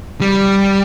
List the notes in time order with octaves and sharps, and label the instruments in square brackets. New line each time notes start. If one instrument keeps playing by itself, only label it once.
[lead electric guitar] G3